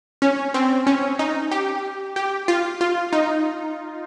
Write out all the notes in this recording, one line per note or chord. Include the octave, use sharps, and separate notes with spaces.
C#4
C4
C#4
D#4
G4
G4
F4
F4
D#4